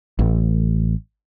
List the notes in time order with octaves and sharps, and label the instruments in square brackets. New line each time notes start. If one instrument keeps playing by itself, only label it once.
[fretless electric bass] A1